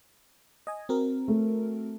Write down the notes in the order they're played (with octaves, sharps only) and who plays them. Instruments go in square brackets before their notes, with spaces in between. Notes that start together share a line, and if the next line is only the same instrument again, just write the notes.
[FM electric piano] D#5 G#5
C4 F#4 A#4
[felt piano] A3